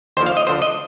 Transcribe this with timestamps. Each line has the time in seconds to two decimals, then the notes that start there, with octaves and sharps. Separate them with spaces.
0.17 D#2 D3 F3 C5
0.26 F5
0.37 D#5
0.47 D2 D3 F3 C5
0.62 D#5